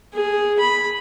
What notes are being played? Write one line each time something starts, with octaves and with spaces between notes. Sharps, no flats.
G#4
B5